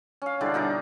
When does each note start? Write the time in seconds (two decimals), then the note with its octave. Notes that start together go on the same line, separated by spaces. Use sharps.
0.22 C#4 F5
0.41 D3 G3 D4 E4
0.54 B2 D#4 A#4 D6